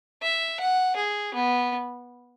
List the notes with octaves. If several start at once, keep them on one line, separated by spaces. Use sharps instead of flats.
E5
F#5
G#4
B3